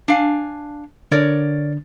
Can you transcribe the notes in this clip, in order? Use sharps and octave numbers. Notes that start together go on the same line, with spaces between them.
D4 F5 G#5
D3 D4 A#4 C#5 D5